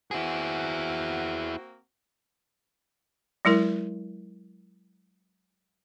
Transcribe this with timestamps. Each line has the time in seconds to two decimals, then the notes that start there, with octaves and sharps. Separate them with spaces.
0.11 A#3 C4 E4 F#4 G#4
3.45 F#3 G#3 E4 A#4